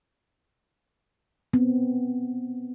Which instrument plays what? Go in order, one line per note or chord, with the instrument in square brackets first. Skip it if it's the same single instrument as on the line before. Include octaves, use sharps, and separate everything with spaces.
[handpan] B3 C4